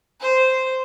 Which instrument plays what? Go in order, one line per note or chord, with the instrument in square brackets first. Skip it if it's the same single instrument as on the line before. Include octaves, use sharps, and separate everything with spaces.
[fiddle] C5